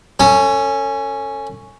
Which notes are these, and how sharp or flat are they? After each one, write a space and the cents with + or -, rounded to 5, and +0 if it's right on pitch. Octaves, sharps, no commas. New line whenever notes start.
C#4 +0 A4 +40